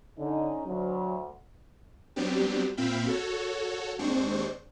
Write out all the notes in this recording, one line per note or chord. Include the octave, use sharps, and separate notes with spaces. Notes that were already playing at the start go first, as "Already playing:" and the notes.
D3 C#4 D#4
D2 F#3
F#3 G3 B3 C4 D4 G4
A#2 C4 E5 F5 G5 B5
F#4 A4 C#5
D#2 G#3 C4 D4 C5 C#6